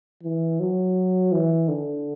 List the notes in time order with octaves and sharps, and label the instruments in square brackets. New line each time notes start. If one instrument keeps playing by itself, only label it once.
[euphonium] E3
F#3
E3
D3